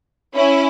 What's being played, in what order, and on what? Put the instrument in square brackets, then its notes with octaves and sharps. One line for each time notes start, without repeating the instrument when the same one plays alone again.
[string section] C#4 E4